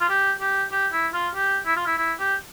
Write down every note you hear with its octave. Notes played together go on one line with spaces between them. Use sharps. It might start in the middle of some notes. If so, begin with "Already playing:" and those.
F4
G4
G4
G4
E4
F4
G4
E4
F4
E4
E4
G4